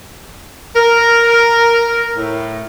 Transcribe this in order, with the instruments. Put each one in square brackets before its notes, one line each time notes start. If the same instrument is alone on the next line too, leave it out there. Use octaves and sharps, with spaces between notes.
[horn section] A#4
A2